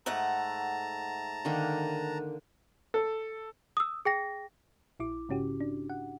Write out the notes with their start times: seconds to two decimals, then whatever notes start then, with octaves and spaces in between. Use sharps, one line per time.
0.06 G#2 A3 F#5 A5 A#5
1.45 D3 D#3 A#3
2.94 A4
3.77 D#6 E6
4.05 G#4 G5 A#6
5.00 A#1 E4 D6
5.29 G#2 C#3 C#4 F#4 G4
5.60 D4
5.90 F#5